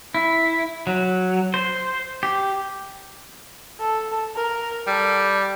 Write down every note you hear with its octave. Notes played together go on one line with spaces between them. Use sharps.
E4
F#3
C5
G4
A4
A#4
G3 A4